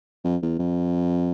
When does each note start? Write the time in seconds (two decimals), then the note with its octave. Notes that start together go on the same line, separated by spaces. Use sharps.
0.25 F2
0.42 E2
0.59 F2